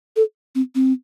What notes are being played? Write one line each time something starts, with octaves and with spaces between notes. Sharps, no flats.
A4
C4
C4